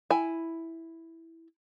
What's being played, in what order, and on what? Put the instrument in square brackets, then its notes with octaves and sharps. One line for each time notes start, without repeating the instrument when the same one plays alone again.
[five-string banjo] E4 G#5